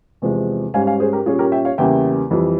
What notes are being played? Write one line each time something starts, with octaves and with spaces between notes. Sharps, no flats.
E2 C3 F3 G#3
G#2 G3 C#4 F5 G#5
F5 G#5
G#4 C5
G4 A#4
A#2 G3 C#4 F4 G#4
G4 A#4
E5 G5
C#5 F5
E2 C#3 G3 A#3 E5 G5
F2 E3 G3